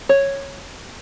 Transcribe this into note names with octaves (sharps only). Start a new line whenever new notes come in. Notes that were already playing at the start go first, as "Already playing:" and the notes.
C#5